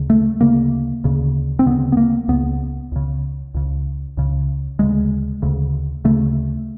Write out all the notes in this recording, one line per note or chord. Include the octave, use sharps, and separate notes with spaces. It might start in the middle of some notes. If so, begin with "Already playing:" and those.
Already playing: D2 C#3
A3
D2 C#3 A#3
D2 C#3
C4
D2 C#3 B3
B3
A#3
C#2 C#3 B3
C#2 C#3
C#2 C#3
C#2 C#3
D2 C#3 G#3
D2 C#3
D2 C#3 A3